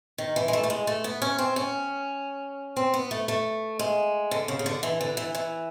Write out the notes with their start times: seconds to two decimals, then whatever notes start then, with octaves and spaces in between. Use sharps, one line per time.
0.18 D#3
0.36 E3
0.48 G#3
0.53 A3
0.63 A3
0.70 G#3
0.87 A3
1.04 B3
1.22 C#4
1.38 C4
1.56 C#4
2.76 C4
2.94 B3
3.11 A3
3.28 A3
3.79 G#3
4.31 D3
4.48 C#3
4.59 C#3
4.66 D3
4.83 E3
5.01 D3
5.17 E3
5.35 E3